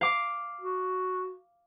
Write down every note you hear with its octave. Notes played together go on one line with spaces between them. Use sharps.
F5 D6
F#4